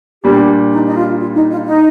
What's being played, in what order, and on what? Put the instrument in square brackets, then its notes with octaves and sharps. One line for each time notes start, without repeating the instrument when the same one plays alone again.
[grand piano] A#2 G3 D4 [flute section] G4
[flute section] D#4
D#4
F4
F4
D#4
F4
D#4